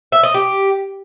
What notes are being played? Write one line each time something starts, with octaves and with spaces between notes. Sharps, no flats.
E5
D#5
G4